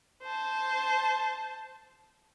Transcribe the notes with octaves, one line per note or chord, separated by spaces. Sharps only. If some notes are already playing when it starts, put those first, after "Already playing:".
C5 A5